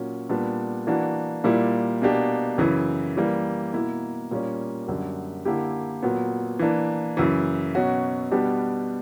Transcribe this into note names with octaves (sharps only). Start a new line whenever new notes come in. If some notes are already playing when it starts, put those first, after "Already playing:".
Already playing: A#2 F#3 C#4
A#2 G3 B3 D4
E3 A#3 D4 F#4
A#2 G3 A#3 E4
B2 A#3 D4 G4
F#2 C#3 E3
E3 G3 A#3
B2 A#3 E4
A#2 G3 A#3 C#4
F#2 D3 G3
D3 A#3 E4 G4
A#2 F#3 B3
E3 A#3 D4
F#2 C#3 E3
B2 F#3 C#4 F#4
B2 G3 B3 D4 G4